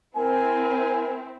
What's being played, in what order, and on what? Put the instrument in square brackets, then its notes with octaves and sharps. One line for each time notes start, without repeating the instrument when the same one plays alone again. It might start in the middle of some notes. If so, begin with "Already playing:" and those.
[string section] C4 E4 [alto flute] A#4 [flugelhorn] G#5